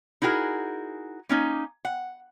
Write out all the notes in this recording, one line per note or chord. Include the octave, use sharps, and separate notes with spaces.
D#4 E4 F#4 G#4 A#4
A#3 C#4 D#4
F#5